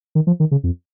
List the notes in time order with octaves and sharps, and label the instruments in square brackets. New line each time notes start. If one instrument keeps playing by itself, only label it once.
[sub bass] D#3
F3
D#3
C#3
F2